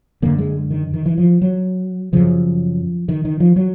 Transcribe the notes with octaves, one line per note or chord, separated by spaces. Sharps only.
F#2 D3 A#3
G#3
D#3
D#3
E3
F3
F#3
F#2 C#3 F3
D#3
D#3
F3
F#3